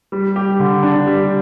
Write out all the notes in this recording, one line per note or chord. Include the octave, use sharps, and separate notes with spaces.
G3
G4
D3
D4
G3